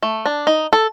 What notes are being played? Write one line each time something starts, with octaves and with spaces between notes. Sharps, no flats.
A3
D4
D#4
A4